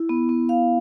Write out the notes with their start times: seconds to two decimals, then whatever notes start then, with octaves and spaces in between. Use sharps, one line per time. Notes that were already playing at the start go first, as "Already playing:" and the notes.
Already playing: E4
0.09 B3
0.29 B3
0.49 F5